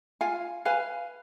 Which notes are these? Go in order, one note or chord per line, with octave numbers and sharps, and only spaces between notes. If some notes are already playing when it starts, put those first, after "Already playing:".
F4 F5 G#5
B4 F5 G#5